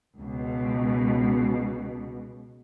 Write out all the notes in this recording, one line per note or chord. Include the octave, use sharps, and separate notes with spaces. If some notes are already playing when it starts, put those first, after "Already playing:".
C#2 B2